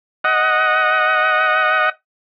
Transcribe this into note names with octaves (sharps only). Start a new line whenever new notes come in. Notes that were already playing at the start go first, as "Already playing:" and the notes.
D#5 F#5